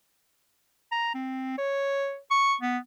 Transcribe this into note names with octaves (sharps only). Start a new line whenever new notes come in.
A#5
C4
C#5
C#6
B3